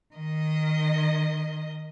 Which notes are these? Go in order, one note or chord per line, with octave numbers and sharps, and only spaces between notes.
D#3 D#5